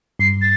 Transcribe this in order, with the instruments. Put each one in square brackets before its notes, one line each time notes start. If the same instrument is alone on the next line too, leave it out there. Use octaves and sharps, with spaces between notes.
[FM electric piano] G2 [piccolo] C7
[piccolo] A6